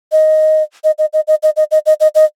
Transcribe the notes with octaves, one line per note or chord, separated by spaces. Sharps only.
D#5
D#5
D#5
D#5
D#5
D#5
D#5
D#5
D#5
D#5
D#5